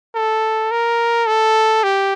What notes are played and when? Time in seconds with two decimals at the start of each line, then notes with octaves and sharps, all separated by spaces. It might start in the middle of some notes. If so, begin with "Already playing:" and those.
0.15 A4
0.72 A#4
1.27 A4
1.83 G4